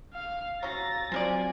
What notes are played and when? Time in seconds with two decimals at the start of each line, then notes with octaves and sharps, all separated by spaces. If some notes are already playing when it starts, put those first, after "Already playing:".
0.13 F5 F6
0.63 F#3 C#4 F5 A#5 E6 A6 A#6
1.12 F3 F#3 C4 A#4 D5 G#5